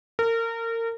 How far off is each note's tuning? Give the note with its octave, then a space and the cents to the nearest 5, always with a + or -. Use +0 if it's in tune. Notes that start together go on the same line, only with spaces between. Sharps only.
A#4 -30